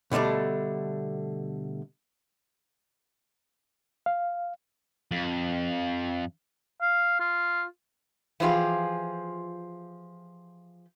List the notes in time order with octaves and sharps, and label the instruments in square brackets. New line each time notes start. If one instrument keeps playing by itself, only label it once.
[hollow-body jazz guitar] B2 D3 G3 A3 D4
[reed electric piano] F5
[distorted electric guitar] F2
[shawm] F5
F4
[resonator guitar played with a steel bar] E3 F3 F4 G4 G#4